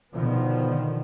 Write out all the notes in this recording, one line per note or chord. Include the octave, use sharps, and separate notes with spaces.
B2 D3 D#3 F3 B3